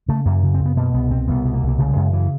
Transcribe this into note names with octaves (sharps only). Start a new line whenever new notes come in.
C#3 A3
F#2 A#3
C#3
C4
F#2
B3
B2 A#3
C2 B3
B2 C4
C2 B3
B2
A#3
C2
A#3
C#3 A3
G3
F#2 G#3
C#3 E3